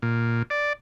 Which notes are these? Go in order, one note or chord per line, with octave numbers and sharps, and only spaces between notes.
A#2
D5